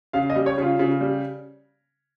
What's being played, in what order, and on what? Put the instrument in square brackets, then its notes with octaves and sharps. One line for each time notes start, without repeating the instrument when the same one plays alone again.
[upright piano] C#3 F5
D#5
G3
C#5
C#3 F4
C#3
G3